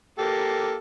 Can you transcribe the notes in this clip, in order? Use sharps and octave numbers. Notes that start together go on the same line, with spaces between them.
A#3 G4 A4